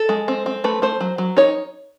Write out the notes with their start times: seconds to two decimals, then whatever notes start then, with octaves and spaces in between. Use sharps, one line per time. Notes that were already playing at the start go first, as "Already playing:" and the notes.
Already playing: A4
0.09 G#3
0.28 C4
0.46 C4
0.64 A3 B4
0.82 A3 C5
1.01 F#3
1.18 F#3
1.37 D#4 C#5